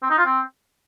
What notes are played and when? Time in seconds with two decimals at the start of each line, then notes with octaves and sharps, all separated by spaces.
0.03 C4
0.10 D#4
0.18 F4
0.26 C4